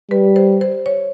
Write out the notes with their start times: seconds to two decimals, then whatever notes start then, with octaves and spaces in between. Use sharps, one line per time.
0.11 G3 B4
0.36 C5
0.61 C5
0.86 C#5